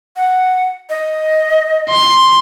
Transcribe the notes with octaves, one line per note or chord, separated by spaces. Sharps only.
F#5
D#5
C6